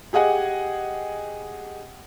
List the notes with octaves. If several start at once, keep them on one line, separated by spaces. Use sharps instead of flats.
G4 G#4 D#5 F#5 G#5